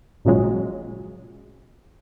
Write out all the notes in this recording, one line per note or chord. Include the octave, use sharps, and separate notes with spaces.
G#1 A#2 C#3 F3 F#3 G#3